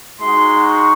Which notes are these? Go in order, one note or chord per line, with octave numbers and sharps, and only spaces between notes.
G#3 D#4 F#4 C6
C#6